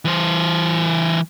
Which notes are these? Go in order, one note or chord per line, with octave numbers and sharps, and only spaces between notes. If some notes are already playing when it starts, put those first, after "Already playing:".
E3 C5